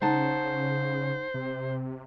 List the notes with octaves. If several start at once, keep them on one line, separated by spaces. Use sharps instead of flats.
C#3 D#4 C5 F#5 A5
C3